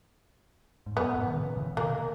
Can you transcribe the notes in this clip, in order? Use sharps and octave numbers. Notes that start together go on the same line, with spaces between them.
G#2
F#2 A#2 B3
G#2 B2
D#3
A#2 C#3
C#3 E3
B2 D#3 A#3